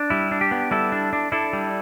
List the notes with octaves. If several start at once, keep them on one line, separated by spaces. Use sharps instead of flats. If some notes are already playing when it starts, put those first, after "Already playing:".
Already playing: D4
G3 E4
D4
G4
B3
G3 E4 A4
D4
D4
D4 E4 A4
G3